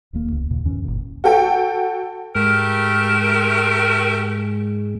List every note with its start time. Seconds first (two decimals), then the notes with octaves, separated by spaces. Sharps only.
0.13 D1 D#2 A#3
0.32 C#2
0.50 D#2 A#2 C#3
0.65 E2 G2 D#3 C#4
0.84 F#1 A#2
1.24 F#4 A4 G5
2.35 G#2 G#3 A3 G4 A#4